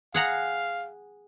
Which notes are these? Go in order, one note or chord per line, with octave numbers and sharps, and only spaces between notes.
G#4 F5 F#5 A#5